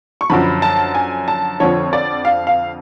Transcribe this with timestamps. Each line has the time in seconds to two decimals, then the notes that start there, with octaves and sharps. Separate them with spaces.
0.21 C#6
0.30 F#2 D3 F3 B5
0.62 A5
0.95 G#5
1.28 A5
1.60 F2 D3 F3 C#5
1.93 D5
2.25 F5
2.47 F5